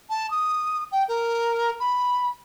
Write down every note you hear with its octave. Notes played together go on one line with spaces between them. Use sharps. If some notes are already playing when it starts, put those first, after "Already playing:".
A5
D#6
G5
A#4
B5